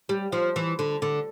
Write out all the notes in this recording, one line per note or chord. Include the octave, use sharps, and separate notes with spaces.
G3
F3
E3
D3
D3